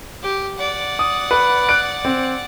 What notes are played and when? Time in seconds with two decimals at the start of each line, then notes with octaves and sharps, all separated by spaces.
0.23 G4
0.57 D5 F#5
0.99 D#6
1.31 B4
1.69 F#6 D7
2.05 C4